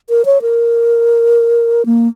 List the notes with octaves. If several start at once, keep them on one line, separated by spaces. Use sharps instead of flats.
A#4
C#5
A#4
A#3